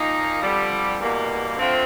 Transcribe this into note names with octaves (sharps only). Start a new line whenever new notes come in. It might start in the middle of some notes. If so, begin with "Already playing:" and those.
Already playing: A#2 F3 A#3 D#4
F2 D3 G3
E2 B2 G3 A#3
D3 F3 A3 C4 F4